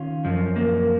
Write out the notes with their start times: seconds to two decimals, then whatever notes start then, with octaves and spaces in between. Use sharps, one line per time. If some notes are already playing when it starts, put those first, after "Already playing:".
Already playing: D#3 C#4 F4
0.25 F#2 F3
0.56 A#3